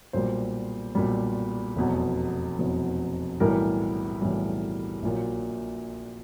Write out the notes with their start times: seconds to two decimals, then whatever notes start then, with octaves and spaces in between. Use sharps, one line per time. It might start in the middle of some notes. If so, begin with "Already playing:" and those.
0.13 B1 A#2 G3 C5
0.95 B1 A#2 G3
1.76 F1 E2 B2 F#3
2.58 F1 E2 B2 F#3
3.40 B1 A2 E3 G3 A#4
4.22 B1 A2 E3 G3
5.02 A#1 A#2 F#3